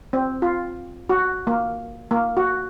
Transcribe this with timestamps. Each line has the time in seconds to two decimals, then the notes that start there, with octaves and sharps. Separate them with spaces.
0.13 C4
0.42 F4
1.09 F#4
1.47 A#3
2.11 A#3
2.37 F#4